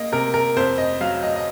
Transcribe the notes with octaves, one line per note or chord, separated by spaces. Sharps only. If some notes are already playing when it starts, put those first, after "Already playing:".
Already playing: A#3 D#5
C3 A#4
A#4
F2 C5
D#5
F#3 F5
D#5
D#5